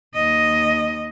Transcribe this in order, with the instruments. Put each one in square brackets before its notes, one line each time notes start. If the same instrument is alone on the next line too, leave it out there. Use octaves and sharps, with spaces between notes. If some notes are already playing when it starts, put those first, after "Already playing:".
[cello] D#2 D#5